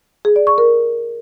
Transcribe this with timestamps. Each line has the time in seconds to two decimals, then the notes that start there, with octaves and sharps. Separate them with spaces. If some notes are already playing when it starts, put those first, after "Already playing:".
0.25 G#4
0.36 D5
0.47 C#6
0.58 A#4